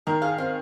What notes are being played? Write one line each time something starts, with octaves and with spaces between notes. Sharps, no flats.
D#3 A#4
G#4 F5
C4 F5